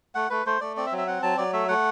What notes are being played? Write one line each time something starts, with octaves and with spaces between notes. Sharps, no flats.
A3 F#5
A3 B4
A3 C5
A3 D5
C4 D5
E5
F#3
E5
C4 F#5
F#3 A5
F#3 D5
A3 E5
A3 F#5